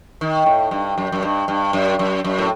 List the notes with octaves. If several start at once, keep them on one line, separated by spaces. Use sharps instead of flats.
D#3
A2
G2
F#2
F#2
G2
G2
F#2
F#2
F#2
A2